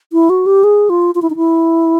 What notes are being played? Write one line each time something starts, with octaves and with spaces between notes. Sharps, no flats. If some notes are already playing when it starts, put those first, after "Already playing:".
E4
F#4
G4
G#4
F4
F4
E4
D#4
E4